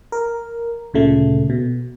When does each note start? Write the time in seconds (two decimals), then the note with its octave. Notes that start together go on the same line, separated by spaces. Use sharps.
0.12 A#4
0.93 D2 A#2 C#3 A3
1.50 B2